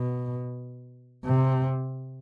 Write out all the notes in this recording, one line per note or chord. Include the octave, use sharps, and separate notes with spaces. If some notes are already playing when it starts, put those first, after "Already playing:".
Already playing: B2
C3